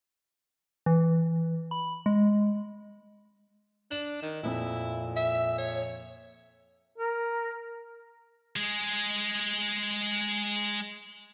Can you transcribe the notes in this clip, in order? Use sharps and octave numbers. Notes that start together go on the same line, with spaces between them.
E3
B5
G#3
D4 F#7
D#3
F2 A#2 E4
E5
C#5
A#4
G#3 G#4